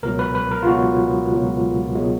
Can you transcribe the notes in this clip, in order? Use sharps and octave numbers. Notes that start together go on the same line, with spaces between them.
C#2 B2 F#3 A#4
B4
B4
A#4
F4
C#2 B2 F#3 F#4
C#2 B2 F#3
B2 F#3 G#3